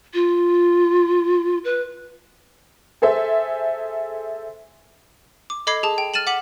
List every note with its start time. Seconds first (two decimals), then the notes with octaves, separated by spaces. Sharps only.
0.14 F4
1.65 B4
3.02 G#4 A4 C5 E5
5.50 D6
5.67 A4 D#5 B5 D6 G#6 C7
5.83 G#4 A5
5.98 G5
6.14 F6 A6 D#7 E7 F#7
6.27 F#5 D6 B6 F#7